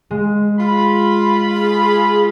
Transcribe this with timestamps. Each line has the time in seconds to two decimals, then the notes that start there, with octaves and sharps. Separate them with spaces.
0.11 G#3
0.59 F4 B5
1.54 G#4